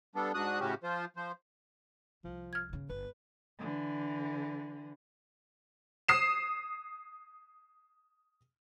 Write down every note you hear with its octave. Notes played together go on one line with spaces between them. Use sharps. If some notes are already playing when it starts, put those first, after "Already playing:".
G3 B3 D4 A4
G#2 D4 F#4 D#6 F#6
A2 C#3 C#4 F#4 G4
F3 F4 C5
F3 C5
C2 F3
F6 G#6
G1 C#3
G1 B4
D3 E3
D#6 C7 E7